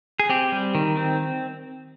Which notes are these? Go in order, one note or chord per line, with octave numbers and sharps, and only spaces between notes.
G#4
C4 G4
G3
D#3
C4